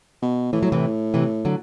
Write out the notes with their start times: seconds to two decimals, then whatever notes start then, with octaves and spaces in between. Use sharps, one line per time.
0.22 B2
0.53 A2 E3
0.63 F#3
0.72 C3 E3
1.14 C3 E3
1.45 D3 F#3